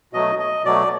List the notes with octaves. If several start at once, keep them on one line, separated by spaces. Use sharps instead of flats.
B2 F#3 A3 D#5
D#5
B2 F#3 A3 D5